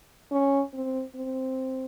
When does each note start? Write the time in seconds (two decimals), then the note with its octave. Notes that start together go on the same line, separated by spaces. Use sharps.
0.31 C#4
0.73 C4
1.16 C4